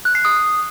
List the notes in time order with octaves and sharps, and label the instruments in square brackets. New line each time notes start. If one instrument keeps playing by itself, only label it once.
[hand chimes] F#6
C7
D#6